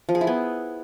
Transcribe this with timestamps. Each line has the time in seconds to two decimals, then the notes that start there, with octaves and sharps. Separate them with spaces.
0.09 F3
0.15 G#4
0.21 E4
0.27 B3